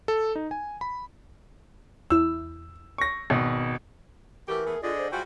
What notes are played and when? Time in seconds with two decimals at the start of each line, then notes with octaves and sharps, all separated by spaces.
0.08 A4
0.35 D#4
0.51 G#5
0.81 B5
2.10 E2 E4 E6
2.98 C#6 A#6
3.30 G#1 B2
4.48 E3 A3 F#4 G4 A#4
4.66 A3 B3 G#4
4.83 D3 F4 G#4 D5 D#5
4.98 C5
5.12 G3 G#3 F4 F#4 C5 G5 G#5